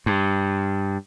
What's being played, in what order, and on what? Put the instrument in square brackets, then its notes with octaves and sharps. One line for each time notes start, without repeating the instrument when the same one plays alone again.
[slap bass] G2